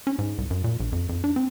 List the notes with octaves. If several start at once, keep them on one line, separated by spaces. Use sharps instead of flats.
C#4
G#2
C2
F#2
A#2
A#1
F2
F2
D4
C4